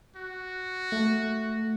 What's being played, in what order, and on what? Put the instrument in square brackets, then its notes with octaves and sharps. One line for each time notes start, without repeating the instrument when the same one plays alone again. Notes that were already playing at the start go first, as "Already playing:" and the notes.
[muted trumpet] F#4
[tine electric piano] A3